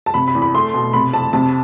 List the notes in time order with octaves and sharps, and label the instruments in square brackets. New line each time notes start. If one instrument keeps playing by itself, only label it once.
[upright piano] A5
C3 B5
B5
E2
B5
A3 C6
B2
C3 B5
F2 A5
C3 A5